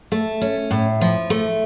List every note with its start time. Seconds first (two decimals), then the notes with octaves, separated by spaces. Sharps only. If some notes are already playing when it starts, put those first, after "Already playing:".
0.12 A3
0.41 C#4
0.71 A2
1.01 F3
1.30 A3